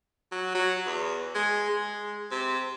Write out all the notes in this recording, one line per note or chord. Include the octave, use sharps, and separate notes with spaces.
F#3
F#3
E2
G#3
G#3
C3